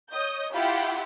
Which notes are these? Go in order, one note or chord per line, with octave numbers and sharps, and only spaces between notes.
C#5 D#5 D#6 G6
E4 F4 G4 F#5 G5 B5